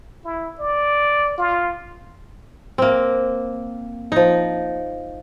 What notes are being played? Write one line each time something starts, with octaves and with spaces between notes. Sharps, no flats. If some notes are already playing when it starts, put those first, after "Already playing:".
E4
D5
F4
A#3 C4
F3 D#4